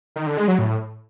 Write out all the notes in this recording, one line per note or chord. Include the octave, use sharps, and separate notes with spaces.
D#3
D3
G#3
F#3
A2